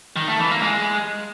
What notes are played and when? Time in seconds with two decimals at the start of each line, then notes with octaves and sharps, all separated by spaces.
0.16 D#3
0.28 A3
0.39 E3
0.51 A#3
0.63 G#3